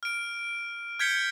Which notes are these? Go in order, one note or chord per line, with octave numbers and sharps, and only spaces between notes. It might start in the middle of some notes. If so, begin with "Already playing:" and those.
F6 D7
F6 G6 G#6 B6 C#7 G7